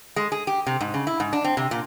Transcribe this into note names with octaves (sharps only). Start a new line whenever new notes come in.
G#3
G#4
G4
C3
G#2
C#3
E4
G#2
D4
C4
C3
A#2